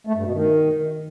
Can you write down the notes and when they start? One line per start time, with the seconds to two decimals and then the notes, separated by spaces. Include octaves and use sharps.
0.07 A3
0.16 G2
0.25 B2
0.34 D#3